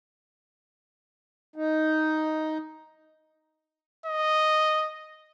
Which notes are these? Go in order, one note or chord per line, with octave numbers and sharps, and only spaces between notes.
D#4
D#5